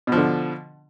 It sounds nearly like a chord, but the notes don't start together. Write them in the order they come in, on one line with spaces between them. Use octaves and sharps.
B2 F3 D3